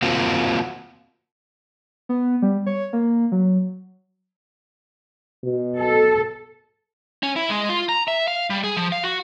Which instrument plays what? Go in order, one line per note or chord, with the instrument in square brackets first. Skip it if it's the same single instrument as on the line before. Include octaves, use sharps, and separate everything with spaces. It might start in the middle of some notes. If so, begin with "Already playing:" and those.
[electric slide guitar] A#3 C4 F4 F#4
[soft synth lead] B3
G3
C#5
A#3
F#3
[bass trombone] B2
[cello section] A4
[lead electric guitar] C#4
E4
G#3
F4
A#5
E5
F5
G3
G#4
F3
F5
F#4